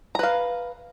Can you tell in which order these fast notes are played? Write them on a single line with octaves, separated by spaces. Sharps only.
A#5 B4 F5